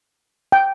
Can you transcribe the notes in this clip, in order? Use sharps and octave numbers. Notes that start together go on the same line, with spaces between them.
G5